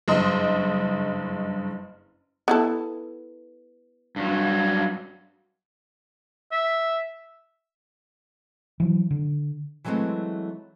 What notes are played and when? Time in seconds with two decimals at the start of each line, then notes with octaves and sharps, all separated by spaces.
0.08 F#1 G2 D#5 C6
2.48 B3 E4 A4
4.16 G2 F#3
6.52 E5
8.80 E3 F#3
9.11 D3
9.84 E3 F#3 G#3 A3 C4 E4